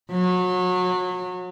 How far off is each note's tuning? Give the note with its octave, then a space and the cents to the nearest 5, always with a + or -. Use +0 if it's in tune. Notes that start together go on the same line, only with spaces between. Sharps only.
F#3 -30